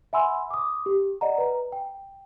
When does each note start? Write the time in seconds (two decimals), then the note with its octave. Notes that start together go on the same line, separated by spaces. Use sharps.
0.13 E5 F#5 G#5 B5 C6 E6
0.51 D6 D#6
0.86 G4
1.21 D5 D#5 F#5 A#5
1.38 B4 A#5
1.72 G5